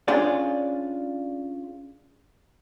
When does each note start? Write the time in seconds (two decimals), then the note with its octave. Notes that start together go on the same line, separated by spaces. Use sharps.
0.08 C#4 D4 F4 G#4 D5